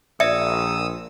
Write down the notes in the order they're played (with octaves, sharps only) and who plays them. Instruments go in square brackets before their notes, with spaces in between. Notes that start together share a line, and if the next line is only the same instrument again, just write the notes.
[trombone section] A#1 [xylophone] D5 C#7 [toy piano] E5 [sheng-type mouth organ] D#6 E6